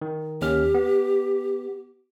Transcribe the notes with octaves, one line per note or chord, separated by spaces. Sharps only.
D#3
D#2 C#4 G4 F6
B3